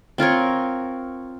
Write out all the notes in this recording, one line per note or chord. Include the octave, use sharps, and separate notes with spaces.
C4 F4 A#4 C#5